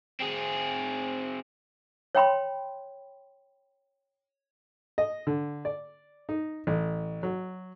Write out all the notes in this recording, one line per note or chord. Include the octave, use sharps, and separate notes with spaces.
C4 G#4
C#5 G5 B5 C6
D#5
D3
D5
D#4
A1
F#3